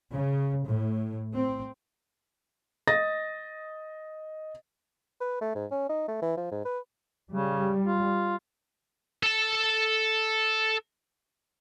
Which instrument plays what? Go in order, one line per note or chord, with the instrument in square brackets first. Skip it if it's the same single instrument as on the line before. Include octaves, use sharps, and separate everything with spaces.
[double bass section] C#3
A2
C4
[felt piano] D#5 D#6 A6 A#6
[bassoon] B4
A3
G#2
C#4
D#4
A3
E3
F3
G#2
B4
[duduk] C#3 [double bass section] G3
[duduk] F4
[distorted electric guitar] A4 A5